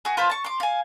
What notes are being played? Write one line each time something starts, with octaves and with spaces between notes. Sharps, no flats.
F#4 G#4
F4 B4 C5 A5
A5 C#6
C6 D6
F5 G#5